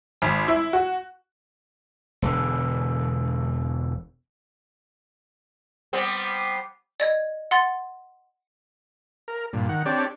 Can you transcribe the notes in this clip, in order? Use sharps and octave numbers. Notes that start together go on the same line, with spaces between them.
G#1
E4
F#4
E1 D3
G3 B3 C4
D5 D#5 G#6
F#5 C6 A6
A#4
G2 A#2
D#3 F#5
C4 D4 G4 C#5 D5